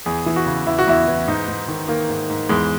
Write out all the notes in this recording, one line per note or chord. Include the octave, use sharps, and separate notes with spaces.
E2 G#4
E3
F#4
C#3
E2 E4
F#4
E2 E4
E3
G#2 D#4
G#2
D#3
D#3 A#3
G#2
G#2
E2 G#3